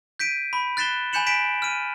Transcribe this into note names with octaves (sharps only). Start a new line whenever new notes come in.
G6 B6 D7 D#7
B5
F#6 A6 B6 C7 E7 G7
G#5 B5 G6 C#7 E7 F#7
G#5 B6 D7 E7
F6 D#7